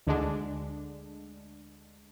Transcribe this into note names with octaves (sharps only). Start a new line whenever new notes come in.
D2 D3 G#3 D4